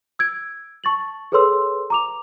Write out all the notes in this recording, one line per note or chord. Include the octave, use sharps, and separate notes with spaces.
E6 G#6 D7
A5 C#6 A6 F#7
G#4 A4 B4 C#5 C6 E6
A#5 D6 F7